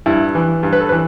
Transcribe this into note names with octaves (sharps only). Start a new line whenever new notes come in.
G2 E4
E3
G2
B4
A4
E3 B4